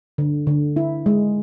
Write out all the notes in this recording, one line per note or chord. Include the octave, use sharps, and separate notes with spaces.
D3
D3
E4
G#3